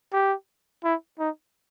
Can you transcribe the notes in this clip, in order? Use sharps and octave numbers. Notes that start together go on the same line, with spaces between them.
G4
E4
D#4